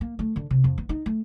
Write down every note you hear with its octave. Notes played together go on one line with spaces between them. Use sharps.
A#3
A3
D3
C3
F2
B3
D#4
A3